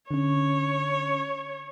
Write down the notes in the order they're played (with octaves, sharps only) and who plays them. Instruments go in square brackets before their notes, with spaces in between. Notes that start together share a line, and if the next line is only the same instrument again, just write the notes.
[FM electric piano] D3 C#4 [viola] C#5